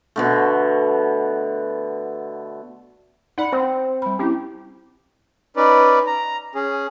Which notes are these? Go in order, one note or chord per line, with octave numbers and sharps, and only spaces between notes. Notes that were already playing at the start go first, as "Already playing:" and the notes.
B2 D3 A3
D#4 D5 F#5 B5
C4 C5
G3 B5
C4 C#4 E4 G4
C#4 D#4 B4 D5
A#5
C#4 G#4